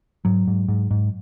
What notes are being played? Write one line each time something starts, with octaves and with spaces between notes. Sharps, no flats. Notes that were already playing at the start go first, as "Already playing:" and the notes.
G#2 F#3
G#2
G#2
G#2